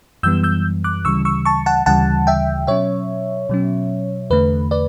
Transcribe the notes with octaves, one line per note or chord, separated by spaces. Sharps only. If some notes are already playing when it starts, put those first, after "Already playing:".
F#2 E3 G3 B3 E6 G6
E6 G6
D6 F#6
D2 C#3 E3 G3 C#6 E6
C#6 E6
A5 C#6
F#5 A5
D2 C#3 E3 G3 F#5 A5
E5 G5
B2 F#3 C#4 C#5 E5
B2 F#3 C#4
E2 D3 A3 B4
B4 D5